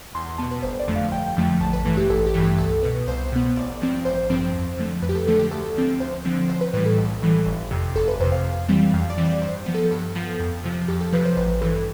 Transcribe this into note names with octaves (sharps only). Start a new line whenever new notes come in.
E2 C6
C6
B2 B3 A5
B4
G1 C5
D5
F2 D3 F3 A3
F5
G1 G5
F2 D3 F3 A3
A1 A5
B4
G2 E3 A3
G4
A1 A4
G4
G2 E3 A3
G4
C2 A4
B2 B3 B4
C2 C5
B2 B3
A1 D5
G2 F3 C4
A1 C5
G2 F3 C4
F2
D3 F3 A3
F2 B4
G4
A4
D3 F3 A3 A4
G4
D2 A4
D3 F3 C4
D2 C5
D3 F3 C4
B1 C5
B4
A2 E3 G3 B4
A4
B1
A2 E3 G3
G1
F2 C3
G1 A4
B4
F2 C3 C5
F5
F2
E3 G3 C4
F2 F5
D5
E3 G3 C4
D5
G2 C5
F3 B3
A4
G2 A4
F3 B3
F2
C3 F3
F2 G4
A4
C3 F3 B4
C5
A1 B4
G2 E3 A4